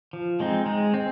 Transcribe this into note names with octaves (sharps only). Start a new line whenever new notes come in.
F3
G#3 C4 D#4
G#3
C4